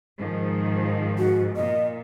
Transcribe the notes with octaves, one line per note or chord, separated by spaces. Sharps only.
G#2 D#3 F3
F#4
A#2 D#5